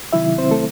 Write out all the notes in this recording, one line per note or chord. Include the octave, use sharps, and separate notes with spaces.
C3 D#3 F#3 E4 E5
C4 C5
A3 A4